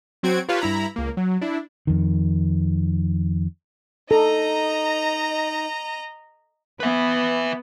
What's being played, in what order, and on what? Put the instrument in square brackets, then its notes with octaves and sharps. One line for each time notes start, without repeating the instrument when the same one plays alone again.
[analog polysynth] F#3 C4 F#4 G#6 D7
F4 G4 B4 C#5 F5 A5
G2 E4 A#5 B5
C#2 A#3
F#3
D4 E4
[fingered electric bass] F2 D#3
[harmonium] D#4 [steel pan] A4 [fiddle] D#5 A#5
[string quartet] B3 [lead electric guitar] B4 E5